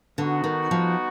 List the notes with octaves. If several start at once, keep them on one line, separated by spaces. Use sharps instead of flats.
D3 B3 D#4 F#4
D#3
F3